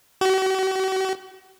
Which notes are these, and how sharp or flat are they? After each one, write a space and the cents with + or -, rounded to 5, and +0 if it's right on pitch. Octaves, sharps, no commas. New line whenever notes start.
F#4 +45